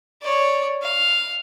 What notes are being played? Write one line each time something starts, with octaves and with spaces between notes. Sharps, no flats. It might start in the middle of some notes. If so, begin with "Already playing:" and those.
C#5 D5
F5